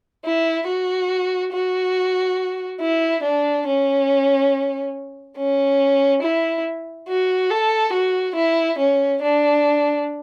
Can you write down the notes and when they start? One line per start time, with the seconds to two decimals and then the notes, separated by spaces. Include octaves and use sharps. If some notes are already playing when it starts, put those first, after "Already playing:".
0.25 E4
0.67 F#4
1.52 F#4
2.81 E4
3.23 D4
3.67 C#4
5.37 C#4
6.22 E4
7.08 F#4
7.50 A4
7.93 F#4
8.35 E4
8.78 C#4
9.22 D4